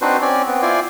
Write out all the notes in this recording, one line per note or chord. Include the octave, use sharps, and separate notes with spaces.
C4 D4 D#4 F#4 B4 C5
C4 C#4 D5 G#5
B3 C4
E4 F4 C5 D5 G#5